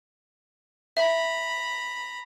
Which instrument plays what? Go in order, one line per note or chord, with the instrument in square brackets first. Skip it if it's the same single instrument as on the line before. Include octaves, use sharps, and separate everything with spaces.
[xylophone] E5 [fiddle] A#5 B5